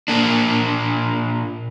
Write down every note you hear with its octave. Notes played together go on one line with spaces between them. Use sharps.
A#2 A#3 D4